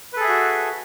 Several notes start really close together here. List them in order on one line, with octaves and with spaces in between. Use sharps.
B4 A4 G#4 E5 F#4